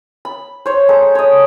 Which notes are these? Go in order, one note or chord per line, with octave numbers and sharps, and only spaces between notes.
B5
C5 C#5
G#3 A4 A#5
C#5 D#5